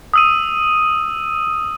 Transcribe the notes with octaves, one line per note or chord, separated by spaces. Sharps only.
D#6 E6 D#7